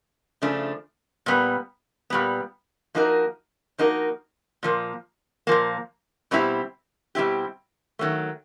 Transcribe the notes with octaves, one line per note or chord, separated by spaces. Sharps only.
C#3 F3 A3 D4
A#2 G3 B3
A#2 G3 B3
F3 A#3 D#4 F#4 A#4
F3 A#3 D#4 F#4 A#4
A#2 F3 A#3
A#2 F3 A#3
B2 G3 C4 E4 G4
B2 G3 C4 E4 G4
D#3 F#3 A3